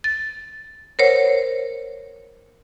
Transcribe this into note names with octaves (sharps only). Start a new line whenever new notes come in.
A6
A#4 C5 C#5 F#5